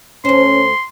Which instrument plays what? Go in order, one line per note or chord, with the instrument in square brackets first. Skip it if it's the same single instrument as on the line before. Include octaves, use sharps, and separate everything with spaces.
[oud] D2 C5 [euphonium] C#4 [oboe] C6